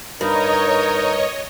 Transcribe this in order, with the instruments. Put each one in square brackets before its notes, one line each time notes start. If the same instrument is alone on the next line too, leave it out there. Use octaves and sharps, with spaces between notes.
[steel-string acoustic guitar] G2 [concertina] D#4 [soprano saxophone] A#4 [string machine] C#5 D#5